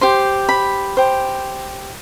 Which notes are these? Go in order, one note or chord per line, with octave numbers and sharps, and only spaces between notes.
G4 C5 C6
B5
G4 C5